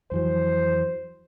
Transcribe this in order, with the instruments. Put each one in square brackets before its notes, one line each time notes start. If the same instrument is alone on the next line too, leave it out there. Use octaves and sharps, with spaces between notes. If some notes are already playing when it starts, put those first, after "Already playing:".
[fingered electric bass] F2 E3 F#3 [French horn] C5